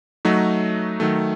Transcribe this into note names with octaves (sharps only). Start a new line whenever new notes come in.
F#3 A3 D#4 F#4
D#3 F#3 A3